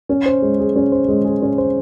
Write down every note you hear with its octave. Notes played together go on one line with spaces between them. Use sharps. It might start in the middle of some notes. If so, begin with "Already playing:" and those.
C#4
C5
G#3
G#4
C#4
C5
G#3
G#4
C#4
C5